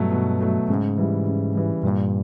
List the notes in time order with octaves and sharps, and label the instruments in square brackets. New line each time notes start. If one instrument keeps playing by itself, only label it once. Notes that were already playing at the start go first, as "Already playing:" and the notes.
Already playing: [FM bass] G2 [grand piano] B2 F#3 A3
[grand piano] B2
F#3 A3
[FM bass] G#2 [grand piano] C#3
[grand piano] E3 G3
C#3
E3 G3
[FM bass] G2 [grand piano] A#2